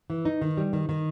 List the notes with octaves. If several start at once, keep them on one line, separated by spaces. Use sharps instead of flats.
E3
D#4
D#3
G3
D#3
D#3